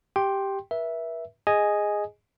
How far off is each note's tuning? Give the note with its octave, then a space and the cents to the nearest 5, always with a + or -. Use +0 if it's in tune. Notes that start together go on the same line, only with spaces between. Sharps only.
G4 +0 G5 +0 C6 +20
B4 -45 E5 +0
G#4 -10 D#5 +0 G#5 +0